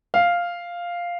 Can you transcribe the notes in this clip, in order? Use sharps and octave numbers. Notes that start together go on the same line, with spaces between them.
F5